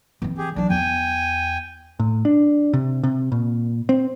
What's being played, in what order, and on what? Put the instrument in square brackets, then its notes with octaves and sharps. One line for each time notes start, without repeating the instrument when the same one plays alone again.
[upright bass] E3 C4
[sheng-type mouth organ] G4 G#4
[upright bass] E3 F#3 [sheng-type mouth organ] D4
[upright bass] E2 [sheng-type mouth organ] G5 G#5
[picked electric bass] A2
D4
C3
C3
A#2
C4